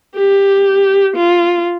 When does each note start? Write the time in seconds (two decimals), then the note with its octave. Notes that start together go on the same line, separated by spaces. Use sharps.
0.16 G4
1.16 F4